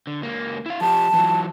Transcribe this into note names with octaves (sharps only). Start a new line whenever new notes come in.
D3
C#2 A#3
E4 F5
F3 G4 A5
E3 F#3